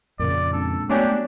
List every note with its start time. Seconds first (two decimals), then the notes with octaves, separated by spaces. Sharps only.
0.19 F2 A#2 C#3 A#4 D5
0.53 G#3 C4 D4 A4
0.90 F#3 A3 B3 D4 G4 C#5 G#5 F#6